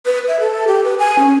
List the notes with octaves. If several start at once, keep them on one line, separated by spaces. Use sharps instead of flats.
B4
E5
A4
G4
B4
G#5
C#4